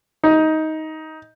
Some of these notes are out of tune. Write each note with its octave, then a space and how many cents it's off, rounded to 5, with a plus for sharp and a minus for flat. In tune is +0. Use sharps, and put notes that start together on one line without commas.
D#4 +15